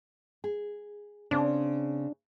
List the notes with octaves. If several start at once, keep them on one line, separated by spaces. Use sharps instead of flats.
G#4
C#3 C4 D4